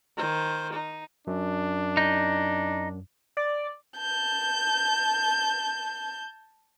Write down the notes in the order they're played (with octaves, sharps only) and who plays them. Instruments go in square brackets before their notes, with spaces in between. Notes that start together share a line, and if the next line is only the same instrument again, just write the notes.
[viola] D#3 C5
D#4
[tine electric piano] F#2 [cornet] D4
[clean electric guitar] D#4
[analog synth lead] D5
[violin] A5 G6